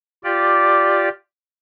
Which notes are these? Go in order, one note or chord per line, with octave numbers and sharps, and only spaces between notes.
F4 G4 D5